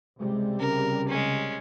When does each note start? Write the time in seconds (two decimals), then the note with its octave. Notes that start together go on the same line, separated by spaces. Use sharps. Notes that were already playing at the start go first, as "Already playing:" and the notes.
0.19 C#2 C3 G3 G#3
0.60 C#3 A#4
1.09 G#3 C#4